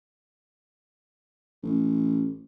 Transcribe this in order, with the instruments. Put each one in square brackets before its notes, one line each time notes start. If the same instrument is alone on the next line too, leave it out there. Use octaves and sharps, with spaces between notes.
[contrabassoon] A1